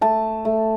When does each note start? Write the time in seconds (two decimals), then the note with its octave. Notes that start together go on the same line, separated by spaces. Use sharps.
0.01 A3 A5
0.45 A3